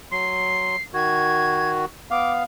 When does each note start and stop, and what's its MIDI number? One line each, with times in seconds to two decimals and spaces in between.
0.12 0.76 54
0.12 0.76 84
0.12 0.82 96
0.94 1.85 51
0.94 1.85 66
0.94 1.71 92
2.11 2.44 59
2.11 2.44 77
2.11 2.32 86